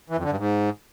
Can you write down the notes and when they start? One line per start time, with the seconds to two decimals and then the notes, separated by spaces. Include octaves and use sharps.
0.10 E3
0.17 F2
0.24 D3
0.30 G2
0.37 G#2